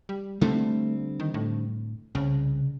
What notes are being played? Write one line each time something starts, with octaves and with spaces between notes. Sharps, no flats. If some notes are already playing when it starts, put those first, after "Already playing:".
G3
D3 G3 A3 C4
D#3
A2
C2 C#3